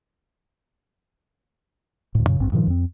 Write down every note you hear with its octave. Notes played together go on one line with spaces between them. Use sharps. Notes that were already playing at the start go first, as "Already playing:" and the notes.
D2 A2
F#2 A#2 C#3
A1 G2 C4
G2 A#2 D#3 F3
F2 C4